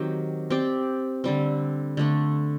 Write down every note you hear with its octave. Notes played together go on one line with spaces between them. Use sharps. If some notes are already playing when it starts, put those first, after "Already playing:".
Already playing: D#3 F#3 C4 G4
C4 G4 D5
D3 G3 C4
D3 A3 D4